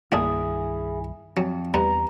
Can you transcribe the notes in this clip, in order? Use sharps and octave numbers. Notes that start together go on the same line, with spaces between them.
C2 G2 D#3 A#3 D4 E4 G#4
F2 F#3
E2 G2 B3 A#5